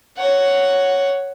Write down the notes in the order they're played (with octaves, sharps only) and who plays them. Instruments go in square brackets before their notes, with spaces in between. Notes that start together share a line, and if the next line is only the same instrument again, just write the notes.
[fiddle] C#5 F#5